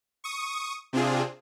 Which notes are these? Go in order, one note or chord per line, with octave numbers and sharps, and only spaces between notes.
C#6 D#6
C3 C4 D4 F4 G#4